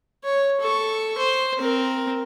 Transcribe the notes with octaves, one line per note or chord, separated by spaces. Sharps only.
C#5
A4 C#6
C5
C4 A#4